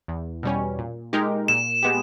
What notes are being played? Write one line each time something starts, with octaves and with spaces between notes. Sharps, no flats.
E2
B2 G3 C#4
A#2
G#3 D#4 G4 A#4
A#2 E7
G#3 B3 G4